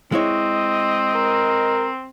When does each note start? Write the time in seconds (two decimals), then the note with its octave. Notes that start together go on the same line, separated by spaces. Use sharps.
0.12 G#3 C4 E4 C#5 D#5
1.16 A#4